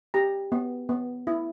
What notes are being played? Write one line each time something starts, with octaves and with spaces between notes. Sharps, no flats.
G4 A#5
B3
B3
E4